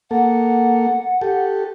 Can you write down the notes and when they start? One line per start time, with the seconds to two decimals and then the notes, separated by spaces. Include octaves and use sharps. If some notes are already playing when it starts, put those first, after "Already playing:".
0.11 A#3 A4 F#5
1.21 G4 A4